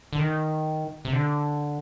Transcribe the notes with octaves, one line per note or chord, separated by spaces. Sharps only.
D3
D#3
C3
D3